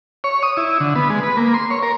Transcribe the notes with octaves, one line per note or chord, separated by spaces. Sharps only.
C#5
D#6
E4
D3
B3
G#3
B4
A#3
C6
C#5
A#4